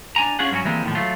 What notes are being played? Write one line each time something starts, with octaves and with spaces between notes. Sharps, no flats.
D4 G#5 A#5
C#4 F4 G#4 F#5
G2 F#3 A#3 C#4 F#4
E3 G3 G#3 A#3 C4
D#2 A2 F3
F#3 A3 F4